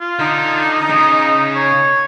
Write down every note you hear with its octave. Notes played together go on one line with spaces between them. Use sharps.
F4
D3 D#4
C#3 D#5
C#5